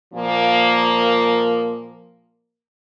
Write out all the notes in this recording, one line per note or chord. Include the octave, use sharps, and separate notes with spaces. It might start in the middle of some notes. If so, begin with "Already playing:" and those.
A#2 F3 A#3